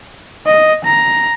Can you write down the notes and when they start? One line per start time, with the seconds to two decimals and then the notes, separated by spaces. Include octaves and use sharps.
0.46 D#5
0.85 A#5